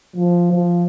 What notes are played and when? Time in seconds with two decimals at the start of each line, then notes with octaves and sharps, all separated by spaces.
0.16 F3
0.52 F3